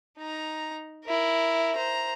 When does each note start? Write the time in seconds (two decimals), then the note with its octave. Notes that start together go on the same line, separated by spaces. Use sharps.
0.19 D#4 A#5
1.06 E4 A#4
1.76 C5 A#5